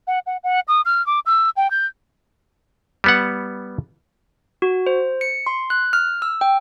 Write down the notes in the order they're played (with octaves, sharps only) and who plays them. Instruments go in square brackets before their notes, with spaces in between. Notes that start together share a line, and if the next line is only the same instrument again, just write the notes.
[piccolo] F#5
F#5
F#5
D#6
F6
D6
E6
G5
G6
[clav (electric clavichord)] G3 B3 F#5
[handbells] F#4
C5
C#7
C6
F#6
F6
E6
G5